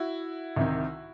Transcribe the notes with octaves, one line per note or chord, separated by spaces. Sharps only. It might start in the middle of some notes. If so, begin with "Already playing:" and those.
Already playing: E4 F#4
C2 C3 D#3